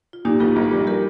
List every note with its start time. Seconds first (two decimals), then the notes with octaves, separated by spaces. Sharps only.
0.13 F4
0.25 A#2 D#4 G4
0.40 A#1 F4 A4
0.56 A#1
0.71 G3
0.87 G3 G4 A#4